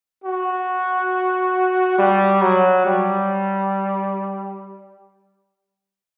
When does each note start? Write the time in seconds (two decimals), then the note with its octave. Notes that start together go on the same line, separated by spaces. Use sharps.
0.24 F#4
1.98 G3
2.42 F#3
2.86 G3